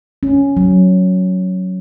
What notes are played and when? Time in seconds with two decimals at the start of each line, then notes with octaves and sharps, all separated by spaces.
0.23 C#4
0.57 F#3